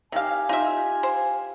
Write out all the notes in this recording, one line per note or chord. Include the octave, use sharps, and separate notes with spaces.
D#3 G4 E5 F5 G#5
D#4 F4 E5
C5